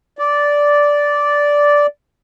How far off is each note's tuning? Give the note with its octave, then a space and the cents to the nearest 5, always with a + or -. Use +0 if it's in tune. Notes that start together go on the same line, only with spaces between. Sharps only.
D5 -10